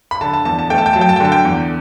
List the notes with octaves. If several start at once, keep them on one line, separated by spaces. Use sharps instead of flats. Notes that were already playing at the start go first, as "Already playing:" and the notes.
B5
D3 A5
A5
E2 A5
A5
A3 G5
A5
G5
F#3 A5
G5
A5
G5
D3 A5
G5
E2